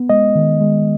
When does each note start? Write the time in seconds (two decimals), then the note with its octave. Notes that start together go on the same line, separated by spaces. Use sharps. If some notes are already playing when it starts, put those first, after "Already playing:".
Already playing: B3
0.09 G#3 D#5
0.36 D#3
0.61 G#3